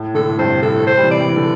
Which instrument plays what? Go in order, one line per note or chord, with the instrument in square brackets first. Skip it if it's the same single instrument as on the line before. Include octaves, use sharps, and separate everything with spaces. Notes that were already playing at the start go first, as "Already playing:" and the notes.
Already playing: [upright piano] A2
[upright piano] A2 D3 [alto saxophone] A4
[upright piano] A2
[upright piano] G2 C3 [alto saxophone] C5
[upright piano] A2 [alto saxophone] A4
[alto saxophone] C5
[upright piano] G3
C3 E3
[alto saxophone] D5
[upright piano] G3
E3
D3